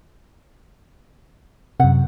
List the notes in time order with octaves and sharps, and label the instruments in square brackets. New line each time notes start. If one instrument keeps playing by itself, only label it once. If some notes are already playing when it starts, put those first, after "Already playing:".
[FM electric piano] F#2 C3 [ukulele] F#5